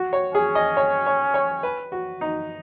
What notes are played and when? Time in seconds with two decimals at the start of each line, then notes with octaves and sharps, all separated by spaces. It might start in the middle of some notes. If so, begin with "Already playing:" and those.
Already playing: F#4
0.13 C#5
0.34 C#4 G#4
0.55 D#5
0.77 C#5
1.06 C#5
1.34 C#5
1.63 B4
1.92 F#4
2.21 D#4